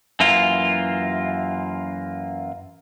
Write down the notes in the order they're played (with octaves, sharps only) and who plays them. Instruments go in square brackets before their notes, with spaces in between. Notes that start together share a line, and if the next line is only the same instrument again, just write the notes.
[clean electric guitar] F#2 E3 A#3 F4